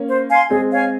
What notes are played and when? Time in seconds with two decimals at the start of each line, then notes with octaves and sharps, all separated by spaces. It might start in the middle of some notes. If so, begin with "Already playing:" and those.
Already playing: A#3 C#4
0.09 C5
0.30 F5 G#5 C6
0.50 G#3 C4 G#4
0.71 C#5 F5 G#5